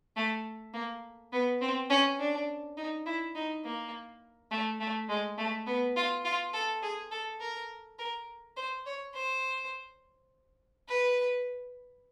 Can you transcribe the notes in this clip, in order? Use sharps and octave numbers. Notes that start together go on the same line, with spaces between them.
A3
A#3
B3
C4
C#4
D4
D#4
E4
D#4
A#3
A3
A3
G#3
A3
B3
F4
F4
A4
G#4
A4
A#4
A#4
C5
C#5
C5
B4